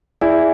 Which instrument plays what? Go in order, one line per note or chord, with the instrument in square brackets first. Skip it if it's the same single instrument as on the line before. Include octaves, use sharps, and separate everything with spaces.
[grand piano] E4 [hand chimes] G#4 D5 G#5